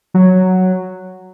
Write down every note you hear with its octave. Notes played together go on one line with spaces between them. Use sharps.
F#3